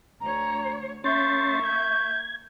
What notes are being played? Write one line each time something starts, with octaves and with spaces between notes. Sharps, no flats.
D2 C#5 A#5
A#3 C#4 E5 C6 C#6 G6 A6
G6 G#6